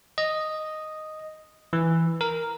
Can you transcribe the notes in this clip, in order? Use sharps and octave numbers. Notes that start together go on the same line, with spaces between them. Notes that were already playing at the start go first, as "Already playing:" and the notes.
D#5
E3
A#4